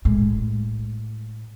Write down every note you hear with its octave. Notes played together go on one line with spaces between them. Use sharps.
A2 G#3